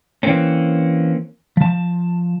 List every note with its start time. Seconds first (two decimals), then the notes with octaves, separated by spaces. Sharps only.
0.23 E3 A#3 C4 C#4
1.57 F3 A5